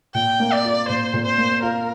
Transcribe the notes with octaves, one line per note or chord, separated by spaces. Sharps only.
A#2 G5
A#3
D5
F4
A#2 C5
A#2
C5
A#3
F4 A#4